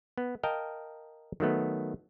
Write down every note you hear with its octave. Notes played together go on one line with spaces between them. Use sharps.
B3
A#4 D#5 F5 G5 A5
D#3 F#3 A3 B3